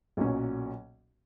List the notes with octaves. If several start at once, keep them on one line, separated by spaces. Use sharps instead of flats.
B1 A#2 F#3 C#4